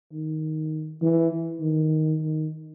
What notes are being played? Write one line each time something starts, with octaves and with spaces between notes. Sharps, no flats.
D#3
E3
D#3
D#3